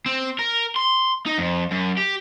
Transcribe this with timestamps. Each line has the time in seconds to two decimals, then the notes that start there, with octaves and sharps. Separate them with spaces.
0.06 C4
0.39 A#4
0.76 C6
1.26 D#4
1.38 F2
1.71 F#2
1.97 G4